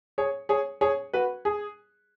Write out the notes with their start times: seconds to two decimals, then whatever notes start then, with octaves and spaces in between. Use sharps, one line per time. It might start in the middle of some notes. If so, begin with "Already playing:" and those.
0.18 G#4 C#5
0.49 G#4 C#5
0.81 G#4 C#5
1.13 F#4 B4
1.45 G#4